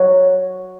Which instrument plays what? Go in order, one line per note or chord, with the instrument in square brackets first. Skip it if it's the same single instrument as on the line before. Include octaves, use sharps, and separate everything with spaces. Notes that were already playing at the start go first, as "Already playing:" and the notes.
Already playing: [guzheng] F#3